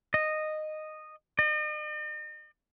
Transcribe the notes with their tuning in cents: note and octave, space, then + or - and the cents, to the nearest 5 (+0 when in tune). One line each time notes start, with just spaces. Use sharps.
D#5 -10
D#5 -45